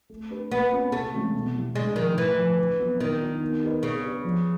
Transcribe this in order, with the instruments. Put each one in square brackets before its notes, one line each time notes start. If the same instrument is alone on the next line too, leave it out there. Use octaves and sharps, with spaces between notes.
[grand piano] A3
D4 G4 B4
[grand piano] A#3 [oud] B3
[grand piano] C#4 F4
[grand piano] C3 [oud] A3
[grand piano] E3 G#3 C#4 F#4
B2
G3 B3 E4
[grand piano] D3 [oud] G#3
[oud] D#3 [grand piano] F3 A3
[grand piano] A2 [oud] E3
[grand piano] F3 A3
D3
F#3 B3
[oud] D#3 [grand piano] B3
[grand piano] D4 F4
B3
D#4 G4 B4 D#5
[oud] C#3 [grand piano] B3
[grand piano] D4 G4 B4 D5
F3